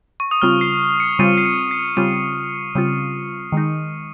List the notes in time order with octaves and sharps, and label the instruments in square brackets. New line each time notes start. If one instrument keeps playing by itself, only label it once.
[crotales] C#6
D#6
[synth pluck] C#3 G3 C4 F4 [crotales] F6
[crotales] C7
C#7
[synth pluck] C#3 G3 C4 F4 [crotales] D#7
[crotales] C7
C#7
C7
[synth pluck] C#3 G3 C4 F4 [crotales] D#7
[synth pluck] C#3 G3 C4 F4
D#3 G#3 D#4